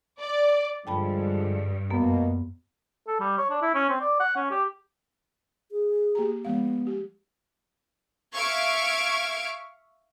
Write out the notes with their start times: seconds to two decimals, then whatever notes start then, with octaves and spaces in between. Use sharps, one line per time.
0.20 D5
0.87 G2 D3 F3 G#3 G5 A5 B5
1.90 F#2 B2 A#3 B3
3.07 A4
3.20 G3
3.38 C#5
3.50 D4
3.62 E4
3.75 C#4
3.90 C4
4.01 D5
4.20 F#5
4.36 C#4
4.51 G4
5.72 G#4
6.15 A#3 G4 A#5
6.45 F3 G#3 B3 F5
6.87 G4
8.35 E5 F5 C#6 F6 G#6 D7